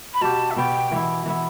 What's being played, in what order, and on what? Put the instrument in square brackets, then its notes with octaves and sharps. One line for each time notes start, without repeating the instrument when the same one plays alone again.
[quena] B5
[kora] B2 B3 G4 [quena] A5
[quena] E5
[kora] B2 B3 G4 [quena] G5
[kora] E3 B3 E4
E3 B3 E4